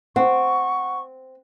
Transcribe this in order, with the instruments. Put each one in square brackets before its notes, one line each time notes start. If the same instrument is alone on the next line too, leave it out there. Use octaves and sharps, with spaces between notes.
[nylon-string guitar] C4 [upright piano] F#5 [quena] C#6